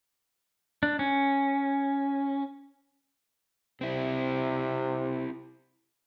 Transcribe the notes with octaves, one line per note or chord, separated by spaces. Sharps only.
D4
C#4
C3 C4 E4